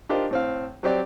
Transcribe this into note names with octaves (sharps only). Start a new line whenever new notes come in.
D4 F4 G4 A#4 C5 D#5
A2 C4 F5
F#3 C4 G4 D5